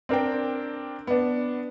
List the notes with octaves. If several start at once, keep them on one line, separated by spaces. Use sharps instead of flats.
C4 D4 A#4 C5 G5
B3 D4